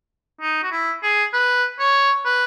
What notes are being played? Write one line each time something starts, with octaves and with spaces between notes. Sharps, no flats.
D#4
F#4
E4
G#4
B4
C#5
B4